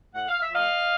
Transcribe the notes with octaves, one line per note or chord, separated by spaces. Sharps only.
A2 F#5
F5
E5
F3 A3 D#5 F5